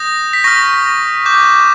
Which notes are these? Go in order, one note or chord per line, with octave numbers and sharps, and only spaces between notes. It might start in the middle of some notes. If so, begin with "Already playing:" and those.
Already playing: D#6 G6 A#6
B6
C#6 F6 A#6
D6 G6